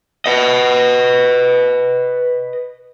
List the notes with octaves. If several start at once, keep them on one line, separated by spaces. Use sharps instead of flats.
B4 D#5